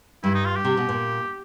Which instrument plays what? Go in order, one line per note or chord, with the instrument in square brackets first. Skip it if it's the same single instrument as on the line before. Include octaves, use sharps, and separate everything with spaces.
[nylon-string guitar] G2 [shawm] E4
[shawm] D#4
F4
G4
[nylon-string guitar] C3
B2
A#2